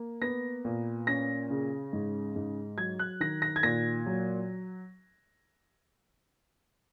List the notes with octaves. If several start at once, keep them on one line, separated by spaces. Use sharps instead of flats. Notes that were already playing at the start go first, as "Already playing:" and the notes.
Already playing: A#3
B3 A#6
A#2
C#4 A#6
C#3
G#2
G#2
F#3 G#6
F#6
D#3 A#6
A#6
G#6
A#2 A#6
F#3